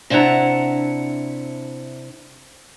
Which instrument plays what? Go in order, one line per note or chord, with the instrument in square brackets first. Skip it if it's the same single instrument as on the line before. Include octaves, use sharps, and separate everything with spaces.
[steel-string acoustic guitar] C3 D4 E4 E5 F#5 A#5